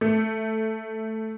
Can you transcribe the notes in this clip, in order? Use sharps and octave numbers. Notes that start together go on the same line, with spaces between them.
A3